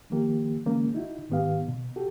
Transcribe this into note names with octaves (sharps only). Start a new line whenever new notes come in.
D#3 F3 A#3 G4
D3 E3 G#3 A#3 C#4
D#4 E4 F#4
G#2 D#3 B3 G4 F5
B2
F#4 G4 A4